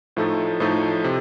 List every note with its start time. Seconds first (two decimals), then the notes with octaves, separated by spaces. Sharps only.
0.17 A2 F3 A3 D#4 A4
0.60 A2 F3 A3 D#4 A4
1.04 C3